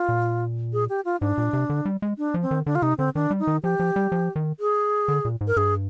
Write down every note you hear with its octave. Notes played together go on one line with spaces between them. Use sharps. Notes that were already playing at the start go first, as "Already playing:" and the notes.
Already playing: F4
A#2
G#4
G4
F4
G#2 D4
A#2
C3
D3
G3
G#3
D4
F3
C4
D#3
D3 D4
F4
C3 D#4
D3 C4
D#3 D4
G3
D#4
D#3
F3 G4
F3
G3
F3
D#3
G#4
D3
A#2
G#2
A#4
G2 G#4